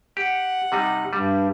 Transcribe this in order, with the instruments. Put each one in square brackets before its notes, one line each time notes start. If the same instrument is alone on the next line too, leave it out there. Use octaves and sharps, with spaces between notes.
[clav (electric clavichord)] G4 [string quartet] F#5
[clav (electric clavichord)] C3 G3 D#4
[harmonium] G2 [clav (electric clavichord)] G3